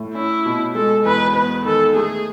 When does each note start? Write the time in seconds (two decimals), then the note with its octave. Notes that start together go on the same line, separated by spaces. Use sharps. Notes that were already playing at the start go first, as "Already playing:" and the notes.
Already playing: A2
0.15 C#4 E4
0.46 B2
0.75 G#3 A4
1.05 E2 B4
1.35 B3 B4
1.65 D#3 A4
1.95 A3 G#4